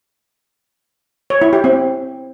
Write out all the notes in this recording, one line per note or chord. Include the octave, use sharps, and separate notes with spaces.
C#5
E4
G4
C4